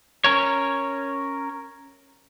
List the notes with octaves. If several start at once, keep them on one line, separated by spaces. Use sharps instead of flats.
C#4 A#4 C#5